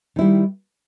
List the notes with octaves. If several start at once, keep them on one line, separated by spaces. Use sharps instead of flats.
D#3 G3 E4